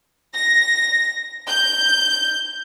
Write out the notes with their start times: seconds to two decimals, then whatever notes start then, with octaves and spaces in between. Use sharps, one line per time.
0.35 A#6
1.48 G6